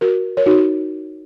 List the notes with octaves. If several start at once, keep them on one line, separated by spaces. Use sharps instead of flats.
F#4 A#4
A#4 C#5
D#4 F#4